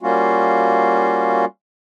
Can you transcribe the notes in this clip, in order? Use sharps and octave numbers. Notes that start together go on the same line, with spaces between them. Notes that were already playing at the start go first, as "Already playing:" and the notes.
G3 A#3 C#4 F4 F#4